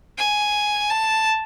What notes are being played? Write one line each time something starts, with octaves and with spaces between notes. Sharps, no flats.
G#5
A5